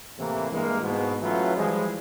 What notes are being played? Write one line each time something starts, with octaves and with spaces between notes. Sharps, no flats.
A2 C3 E3 A#3
G2 E3 G#3 A#3
G#2 B2
E3 F#3 A3 C#4 F4 B4
E3 F3 G3 G#3